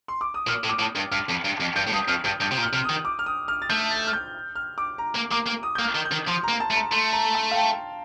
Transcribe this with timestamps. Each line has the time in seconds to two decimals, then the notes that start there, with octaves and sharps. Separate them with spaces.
0.08 C6
0.21 D6
0.34 D#6
0.47 A#2 F6
0.64 A2
0.69 D6
0.79 A2
0.96 G2
1.11 G2 F6
1.29 F2
1.44 G2
1.60 F2
1.76 G2 G6
1.87 A2
1.92 G2 D#6
2.08 F2 F6
2.25 G2 G6
2.41 G2 G6
2.51 C3
2.58 A#2
2.63 F6
2.73 C3 F6
2.84 D#6
2.89 D#3
3.05 D6
3.19 F6
3.26 D#6
3.48 F6
3.62 A6
3.69 A3 G6
3.91 A6
4.07 F6
4.13 G6
4.56 F6
4.78 D6
4.98 A#5
5.15 A#3
5.31 A#3 D6
5.46 A#3
5.63 D#6
5.75 A#3 G6
5.84 F6
5.95 D#3
6.05 G6
6.11 D#3
6.27 F3 C6
6.43 A#3 A#5
6.60 A5
6.70 A3
6.76 A#5
6.91 A3 C6
7.13 A#5
7.35 A5
7.51 F5
7.56 G5